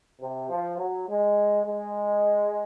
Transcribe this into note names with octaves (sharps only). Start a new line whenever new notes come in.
C3
F3
F#3
G#3
G#3